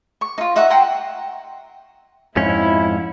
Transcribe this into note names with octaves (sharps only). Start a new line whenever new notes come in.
C#6
D#4 F4
D#4 E5 F#5 C#6
F#5 G5 A#5 C6
F2 G#2 C#4 E4